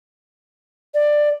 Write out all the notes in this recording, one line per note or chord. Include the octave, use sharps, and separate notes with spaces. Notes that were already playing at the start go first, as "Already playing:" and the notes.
D5